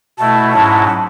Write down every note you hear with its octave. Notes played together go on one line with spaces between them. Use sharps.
B2 A3 E4 A5
G#2 F#3 C#4 E4